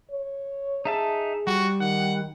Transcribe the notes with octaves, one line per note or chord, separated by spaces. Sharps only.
C#5
D#4 G#4 E5 A5
G3 F#4
D#3 F#5